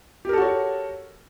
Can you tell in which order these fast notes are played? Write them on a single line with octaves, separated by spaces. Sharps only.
G4 A#4 A4 F#4 C#5